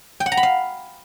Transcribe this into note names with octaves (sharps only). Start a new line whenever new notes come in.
G5
F#5
A#5
B5
F5